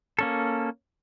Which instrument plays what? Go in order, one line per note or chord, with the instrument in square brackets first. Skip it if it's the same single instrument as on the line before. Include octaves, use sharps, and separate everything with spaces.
[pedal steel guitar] A#3 C#4 A4